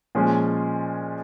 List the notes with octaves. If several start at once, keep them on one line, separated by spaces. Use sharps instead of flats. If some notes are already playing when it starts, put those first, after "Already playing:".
A#2 F3 G#3 C#4 G#4